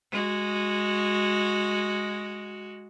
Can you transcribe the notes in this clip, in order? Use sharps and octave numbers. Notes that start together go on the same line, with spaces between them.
G#3 F#4